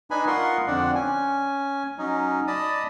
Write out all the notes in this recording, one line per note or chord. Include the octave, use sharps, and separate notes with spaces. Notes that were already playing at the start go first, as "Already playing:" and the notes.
D4 D#4 B4 G#5 B5
F4 A#4 D#5 F#5 C6 C#6
F2 D3 C4 D4 D5 F#5
C#4 G#5
F#3 C#4 D#4
D5 D#5 A5 B5 D#6